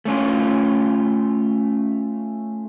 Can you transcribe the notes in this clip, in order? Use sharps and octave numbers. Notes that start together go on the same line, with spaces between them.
A3 C#4 F4